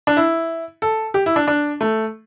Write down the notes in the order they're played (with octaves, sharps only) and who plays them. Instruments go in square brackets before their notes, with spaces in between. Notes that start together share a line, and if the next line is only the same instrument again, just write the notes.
[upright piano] D4
E4
A4
G4
E4
D4
D4
A3